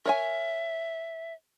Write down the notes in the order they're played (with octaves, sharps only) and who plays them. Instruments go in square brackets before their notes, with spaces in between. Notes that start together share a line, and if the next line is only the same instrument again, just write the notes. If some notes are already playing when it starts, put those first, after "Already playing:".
[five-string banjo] A#4 C#5 G#5 [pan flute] E5